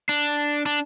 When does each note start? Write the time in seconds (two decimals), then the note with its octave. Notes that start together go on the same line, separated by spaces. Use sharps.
0.09 D4
0.66 D4